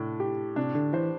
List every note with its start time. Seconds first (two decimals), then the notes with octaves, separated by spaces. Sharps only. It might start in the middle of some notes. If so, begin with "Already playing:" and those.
Already playing: A2 C3 D4
0.20 G4
0.56 C3 D4
0.75 D3
0.93 E3 C5